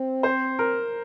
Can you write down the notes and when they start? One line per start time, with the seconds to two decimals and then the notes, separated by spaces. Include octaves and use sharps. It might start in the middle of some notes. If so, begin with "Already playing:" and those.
Already playing: C4
0.23 C5
0.59 A#4